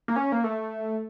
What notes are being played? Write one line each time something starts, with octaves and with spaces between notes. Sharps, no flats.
A#3
C#4
A#3
A3